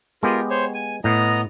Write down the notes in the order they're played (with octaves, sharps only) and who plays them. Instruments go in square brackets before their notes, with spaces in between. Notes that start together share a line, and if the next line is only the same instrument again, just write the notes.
[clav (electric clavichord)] G#3 B3 G4 [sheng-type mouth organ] F4 A#4
[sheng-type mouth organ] C5 C#5
G#5
[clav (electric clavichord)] A2 [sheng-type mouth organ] B3 D#5 A#5